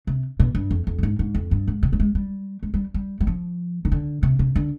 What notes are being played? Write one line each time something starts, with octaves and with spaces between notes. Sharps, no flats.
C3
B2
G2
F2
F2
B2
G#2
G#2
F2
G2
G#2
C3
G3
G#3
G3
G#3
G3
G3
G3
F3
D#3
D3
C3
C3
D3